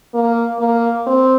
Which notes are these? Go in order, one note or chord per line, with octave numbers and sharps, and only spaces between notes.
A#3
A#3
C4